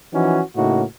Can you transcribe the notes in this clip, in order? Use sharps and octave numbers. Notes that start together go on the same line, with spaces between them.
E3 F3 C#4 D#4 F#4
A2 C#3 A#3 D#4 F#4